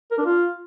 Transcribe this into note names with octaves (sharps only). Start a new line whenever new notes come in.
A#4
D4
F4